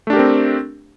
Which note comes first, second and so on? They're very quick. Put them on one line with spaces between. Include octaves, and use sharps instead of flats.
A3 D4 G4 A#4 C4